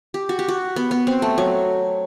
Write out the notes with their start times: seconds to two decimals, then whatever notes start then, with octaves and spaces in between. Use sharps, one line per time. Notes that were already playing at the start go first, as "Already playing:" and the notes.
0.14 G4
0.29 F#4
0.39 G4
0.48 F#4
0.76 B3
0.91 B3
1.07 C4
1.22 A3
1.38 F#3